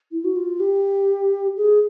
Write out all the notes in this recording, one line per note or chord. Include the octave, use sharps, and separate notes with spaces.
E4
F#4
F4
G4
G#4